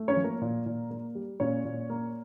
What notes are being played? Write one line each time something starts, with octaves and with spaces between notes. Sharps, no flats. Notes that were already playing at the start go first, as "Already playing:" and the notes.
Already playing: A3
C#4 C#5
F3
A#3 A#4
A#2
A#2
A#3
G3
A#2 C#4 C#5
A#2
A#3